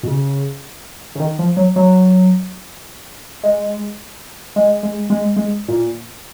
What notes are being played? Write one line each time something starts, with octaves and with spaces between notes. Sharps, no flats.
B2
C#3
C#3
D#3
F3
F#3
F#3
G#3
G#3
G#3
G#3
G#3
A#2